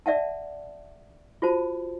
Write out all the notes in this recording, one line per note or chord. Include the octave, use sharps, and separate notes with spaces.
D5 E5 F#5 A5
F4 F#4 C5 A5